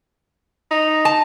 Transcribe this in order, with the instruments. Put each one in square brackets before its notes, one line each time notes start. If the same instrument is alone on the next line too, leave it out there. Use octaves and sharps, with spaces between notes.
[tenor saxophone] D#4
[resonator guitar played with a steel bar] A5